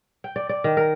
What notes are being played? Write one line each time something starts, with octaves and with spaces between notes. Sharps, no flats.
G5
D5
D5
D#3
A#4